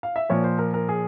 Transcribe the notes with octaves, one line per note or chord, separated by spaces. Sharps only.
F5
E5
A#2 F3 A#3 C#5
C5
A#4
A#4
G#4